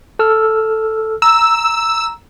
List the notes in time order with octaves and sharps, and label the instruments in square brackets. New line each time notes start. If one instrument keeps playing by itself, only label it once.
[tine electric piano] A4 E6 F6
[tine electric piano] A#5 [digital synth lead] E6